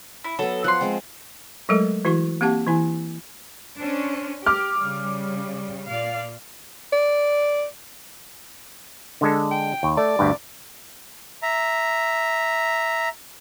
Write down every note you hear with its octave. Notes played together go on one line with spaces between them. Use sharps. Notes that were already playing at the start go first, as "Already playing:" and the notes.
E4
F#3 B3 A4
F3 F#5 C6
G#3 C4
F#3 G#3 A3 A4 A#4
E3 E4 F#4 C#6
A#3 C4 G4 F#5 A5
E3 E4 G#5
C#4 D4 C5
G4 D6 F6
C#3 G3
A#2 D5 F5
D5
D3 G#3 A4
G5
D#2
A3 D5
D2 G2
E5 A#5